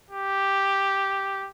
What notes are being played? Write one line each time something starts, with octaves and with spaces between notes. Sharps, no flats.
G4